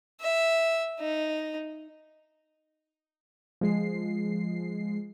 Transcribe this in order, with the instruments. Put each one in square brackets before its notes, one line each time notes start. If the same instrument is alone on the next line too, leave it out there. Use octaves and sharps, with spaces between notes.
[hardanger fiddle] E5
D#4
[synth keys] F3 G#3 C7